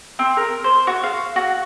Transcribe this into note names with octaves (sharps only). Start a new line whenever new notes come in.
C4
A#4
C5
F#4
F5
F#4